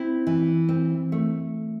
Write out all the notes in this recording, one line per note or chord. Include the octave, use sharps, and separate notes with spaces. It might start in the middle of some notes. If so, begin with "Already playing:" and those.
Already playing: C4 E4
E3
C4
A3